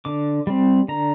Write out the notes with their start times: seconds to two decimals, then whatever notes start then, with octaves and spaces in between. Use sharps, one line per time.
0.05 D3 D6
0.47 G3 C4
0.88 D3 A#5